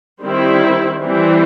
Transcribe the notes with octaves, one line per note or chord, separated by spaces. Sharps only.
D#3 G3 C4 E4
E3 G3 C4